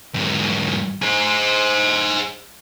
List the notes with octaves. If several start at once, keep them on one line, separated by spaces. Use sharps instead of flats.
E2 G#2
G#4 C5